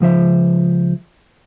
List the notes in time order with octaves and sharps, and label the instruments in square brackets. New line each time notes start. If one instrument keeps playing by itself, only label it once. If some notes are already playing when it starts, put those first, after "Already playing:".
[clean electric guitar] C#2 F3 C5 E5